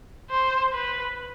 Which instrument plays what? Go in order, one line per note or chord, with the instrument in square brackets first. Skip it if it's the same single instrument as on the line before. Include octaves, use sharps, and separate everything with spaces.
[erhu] C5
B4